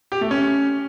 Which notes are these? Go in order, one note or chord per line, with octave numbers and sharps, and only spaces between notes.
G4
A3
C#4